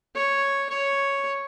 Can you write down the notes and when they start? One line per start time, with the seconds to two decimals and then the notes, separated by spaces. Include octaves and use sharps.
0.15 C#5
0.70 C#5